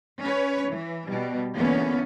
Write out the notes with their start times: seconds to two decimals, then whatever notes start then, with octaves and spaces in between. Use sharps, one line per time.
0.21 C#4 B4 C#5
0.70 E3
1.07 B2 G3
1.54 E2 D3 A#3 B3 C#4